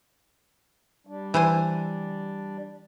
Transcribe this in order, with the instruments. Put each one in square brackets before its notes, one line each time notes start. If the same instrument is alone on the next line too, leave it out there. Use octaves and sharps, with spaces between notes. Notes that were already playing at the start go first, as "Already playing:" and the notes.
[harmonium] G3 D4
[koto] E3 C5 G#5